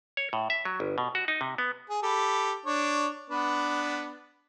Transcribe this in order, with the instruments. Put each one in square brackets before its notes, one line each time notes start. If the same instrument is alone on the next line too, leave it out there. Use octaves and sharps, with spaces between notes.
[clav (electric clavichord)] C#5
A2
E5
F#3
G1
B2
F#4
D#4
C3
B3
[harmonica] G#4
G4 A4 B5
D4 C#5
B3 D4 B4